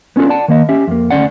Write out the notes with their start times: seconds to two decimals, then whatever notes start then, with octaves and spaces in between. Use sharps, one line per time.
0.16 B3 C#4 D4 F4 A4
0.29 D5 F#5 A5
0.48 D#3 A#3 D#5
0.69 C#4 G4 E5
0.87 F2 A#3
1.11 D2 G#2 C#4 D5 F#5